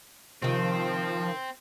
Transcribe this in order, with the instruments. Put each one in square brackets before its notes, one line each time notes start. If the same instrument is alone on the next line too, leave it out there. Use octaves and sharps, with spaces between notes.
[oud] C3 D#3 [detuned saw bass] F3 [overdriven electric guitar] C4